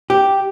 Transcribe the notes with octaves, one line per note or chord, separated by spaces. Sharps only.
G4